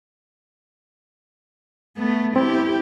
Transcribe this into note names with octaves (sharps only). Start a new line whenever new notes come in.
A3 B3
C4 E4 G4